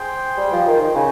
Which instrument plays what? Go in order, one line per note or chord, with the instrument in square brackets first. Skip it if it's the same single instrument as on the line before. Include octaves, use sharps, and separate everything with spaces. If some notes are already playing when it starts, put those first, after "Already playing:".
Already playing: [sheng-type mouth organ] G#4 C5 G5
[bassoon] G3
F3
D#3
D#3
[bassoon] C#3 [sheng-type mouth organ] G#4 D#5